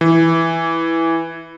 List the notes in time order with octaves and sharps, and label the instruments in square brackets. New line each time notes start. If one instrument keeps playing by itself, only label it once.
[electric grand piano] E3